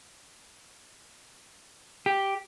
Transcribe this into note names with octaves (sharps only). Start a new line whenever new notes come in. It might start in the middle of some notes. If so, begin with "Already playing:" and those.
G4